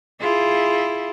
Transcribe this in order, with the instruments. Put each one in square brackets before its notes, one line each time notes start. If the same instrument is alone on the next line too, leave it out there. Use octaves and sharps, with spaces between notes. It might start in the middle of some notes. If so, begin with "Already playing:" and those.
[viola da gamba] E4 F4 G#4